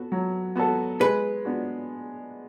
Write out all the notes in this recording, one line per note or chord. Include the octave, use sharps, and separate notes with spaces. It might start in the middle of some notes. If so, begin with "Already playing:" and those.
Already playing: B3 F#4 A4
F#3
B3 F#4 A4
G#3 B4
B3 D4 F#4